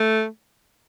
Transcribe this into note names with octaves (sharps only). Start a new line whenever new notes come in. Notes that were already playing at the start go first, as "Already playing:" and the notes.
Already playing: A3